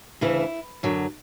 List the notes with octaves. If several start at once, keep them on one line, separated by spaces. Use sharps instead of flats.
D2 C#3 E3 E4
F#2 D3 F#3